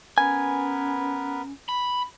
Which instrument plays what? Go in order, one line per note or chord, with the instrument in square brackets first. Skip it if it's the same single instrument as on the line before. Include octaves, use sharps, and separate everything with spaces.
[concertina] B3 A#4 B4 [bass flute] C#4 [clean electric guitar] G#5
[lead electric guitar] B5